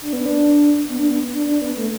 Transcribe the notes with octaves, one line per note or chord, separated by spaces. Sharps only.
D4
B3
D4
B3
D4
B3
D4
D4
B3
A3